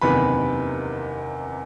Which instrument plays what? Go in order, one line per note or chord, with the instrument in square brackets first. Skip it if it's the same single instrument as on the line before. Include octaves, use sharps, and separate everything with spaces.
[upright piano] F#1 E2 C3 D#3 B4 B5